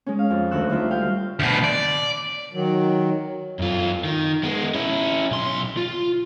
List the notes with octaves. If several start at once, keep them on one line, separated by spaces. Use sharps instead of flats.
G#3 C#4
F5
F2
D2 D#3 C#6 E6 F#6
D2 G3 F4 E5
F5 G5
D2 B2
D5
D#3 F#3
F#2 F4
D#3
G#3 B3
C#4 E4
B1 C6
F4